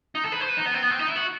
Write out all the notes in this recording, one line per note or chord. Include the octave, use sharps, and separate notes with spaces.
D#4
A4
B4
C5
B4
D#4
B3
C4
B3
C4
D#4
E4
F#4